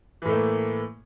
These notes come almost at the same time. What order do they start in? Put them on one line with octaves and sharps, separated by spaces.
E3 A2 A3 A#3